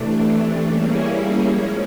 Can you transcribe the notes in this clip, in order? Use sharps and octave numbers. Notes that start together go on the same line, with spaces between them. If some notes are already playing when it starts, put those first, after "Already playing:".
Already playing: C3 E3 A3 D4
G3 A#3 C#4 E4 G#4
F3 G#3 C#4